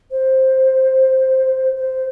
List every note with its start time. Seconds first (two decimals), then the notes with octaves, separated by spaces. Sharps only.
0.11 C5
1.76 C5